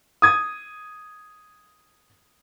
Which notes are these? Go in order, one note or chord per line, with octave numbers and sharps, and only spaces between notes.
D#6 G#6